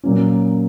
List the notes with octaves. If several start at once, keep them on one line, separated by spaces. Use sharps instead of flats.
A#2 F#3 A#3 C#4